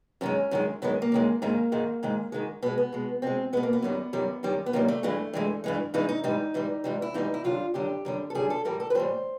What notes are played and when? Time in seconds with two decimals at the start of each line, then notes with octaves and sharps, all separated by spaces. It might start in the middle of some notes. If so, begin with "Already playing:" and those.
0.21 F#2 D#3 G#3 C#4
0.51 F#2 D#3 G#3
0.82 F#2 D#3 G#3 B3
1.02 A#3
1.12 F#2 D#3 G#3
1.42 G#2 D#3 G#3 A#3
1.72 G#2 D#3 G#3
2.03 G#2 D#3 G#3
2.32 G#2 D#3 G#3
2.62 B2 G#3 B3
2.78 B3
2.93 B2 G#3
3.22 B2 G#3 C4
3.53 B2 G#3 B3
3.63 A#3
3.73 B3
3.82 F#2 D#3 G3
4.13 F#2 D#3 G3
4.43 F#2 D#3 G3
4.66 B3
4.73 F#2 D#3 G3 A#3
4.88 A3
5.03 G2 E3 G#3 A3
5.33 G2 E3 G#3
5.64 G2 E3 G#3
5.94 G2 E3 G#3 D#4
6.09 D#4
6.24 G#2 E3 G3 D#4
6.54 G#2 E3 G3
6.84 G#2 E3 G3
7.02 E4
7.14 G#2 E3 G3 D#4
7.34 E4
7.44 F#2 D3 G3 F4
7.74 F#2 D3 G3 G4
8.05 F#2 D3 G3
8.30 A4
8.35 F#2 D3 G3 G#4
8.50 A4
8.65 A2 E3 G3 A#4
8.80 A4
8.90 B4
8.95 A2 E3 G3 C5